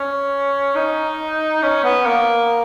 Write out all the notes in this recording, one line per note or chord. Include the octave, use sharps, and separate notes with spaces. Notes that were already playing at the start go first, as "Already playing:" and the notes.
Already playing: C#4
D#4
C#4
B3
A#3